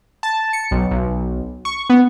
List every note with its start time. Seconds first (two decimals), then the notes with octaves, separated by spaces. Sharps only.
0.23 A5
0.53 C#7
0.71 B1
0.91 B1
1.65 C#6
1.90 B3